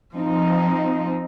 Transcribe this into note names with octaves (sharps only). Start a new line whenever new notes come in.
F3 C4 D#4